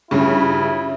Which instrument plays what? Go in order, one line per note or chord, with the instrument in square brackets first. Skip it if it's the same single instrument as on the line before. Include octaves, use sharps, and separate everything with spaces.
[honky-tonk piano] G2 C#3 [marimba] C#4 F4 [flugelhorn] E4